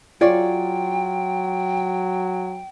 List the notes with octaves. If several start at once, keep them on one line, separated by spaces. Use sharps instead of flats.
F#3 F4 G#4 C#5 D5 G5